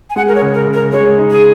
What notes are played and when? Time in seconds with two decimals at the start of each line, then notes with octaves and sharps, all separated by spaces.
0.10 G#5
0.16 G#3 F#5
0.28 A#4
0.35 C#5
0.42 C#3
0.54 A#4
0.67 C#3
0.74 A#4
0.92 G#3 C#5
1.18 D#4
1.31 G#4